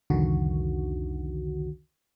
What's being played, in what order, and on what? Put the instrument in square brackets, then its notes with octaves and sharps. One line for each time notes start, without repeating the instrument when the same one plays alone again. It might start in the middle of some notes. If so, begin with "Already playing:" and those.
[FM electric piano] C2 F2 D3 D#3 F#4